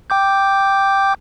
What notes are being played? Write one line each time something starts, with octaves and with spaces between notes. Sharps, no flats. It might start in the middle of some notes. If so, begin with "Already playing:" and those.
G5 D6 G6